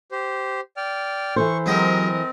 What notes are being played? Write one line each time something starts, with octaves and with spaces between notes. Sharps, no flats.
G4 C5
D5 G5 F6
E3 A4 C5 C#6
F#3 G#3 C4 G4 A#4 D#5